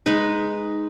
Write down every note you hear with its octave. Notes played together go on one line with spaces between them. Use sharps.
G#3 D#4 B4